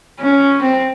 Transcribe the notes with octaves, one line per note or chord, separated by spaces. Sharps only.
C#4
C4